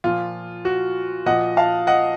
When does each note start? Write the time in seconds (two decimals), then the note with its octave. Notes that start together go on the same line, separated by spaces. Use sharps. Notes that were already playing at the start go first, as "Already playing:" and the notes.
0.04 A#2 F3 F4
0.65 F#4
1.26 A#2 F3 D#5 F#5
1.57 F5 A5
1.87 D#5 F#5